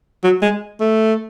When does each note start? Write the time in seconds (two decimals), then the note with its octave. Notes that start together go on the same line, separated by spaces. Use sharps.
0.24 F#3
0.42 G#3
0.80 A3